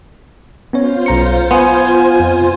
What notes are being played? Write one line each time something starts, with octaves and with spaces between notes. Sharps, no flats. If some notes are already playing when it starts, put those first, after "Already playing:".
B3 C#4 F4 C5 C#5
B1 A#5 C#7
B3 G#5 C6
F2